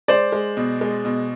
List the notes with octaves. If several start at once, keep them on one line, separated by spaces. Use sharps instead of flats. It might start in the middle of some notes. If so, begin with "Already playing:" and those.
G#3 C5 D5
G#3
B2
G#3
B2